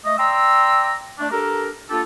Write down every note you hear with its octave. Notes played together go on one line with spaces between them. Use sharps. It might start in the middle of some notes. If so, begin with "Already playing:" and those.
A3 D#5
D5 G5 A#5 C6 E6
A3 D4
D4 G4 A4 A#4
A#3 D4 F4 G4 A4